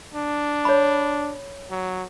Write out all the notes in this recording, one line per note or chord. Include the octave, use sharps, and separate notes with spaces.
D4
C#5 B5
F#3